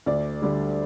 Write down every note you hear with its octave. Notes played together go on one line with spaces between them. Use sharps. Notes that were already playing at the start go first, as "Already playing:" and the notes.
D2 D5
D3 G3